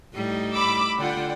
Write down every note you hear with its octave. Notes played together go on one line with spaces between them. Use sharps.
A2 G3 D#4
B5 D6 E6
D3 F4 D5 F#5 G5